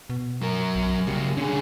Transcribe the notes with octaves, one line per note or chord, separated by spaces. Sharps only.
B2
F#3 A#4
B1
C#3 G3 A#3
D3 C#4 G#4